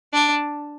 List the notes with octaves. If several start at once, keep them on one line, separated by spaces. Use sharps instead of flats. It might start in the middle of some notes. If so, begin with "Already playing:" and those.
D4